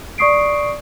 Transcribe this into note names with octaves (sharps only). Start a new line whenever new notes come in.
D5 C#6 D#6 C7 D7